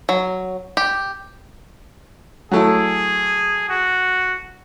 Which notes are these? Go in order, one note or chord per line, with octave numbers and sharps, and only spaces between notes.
F#3
G4
F#3 A3 E4 G#4
F#4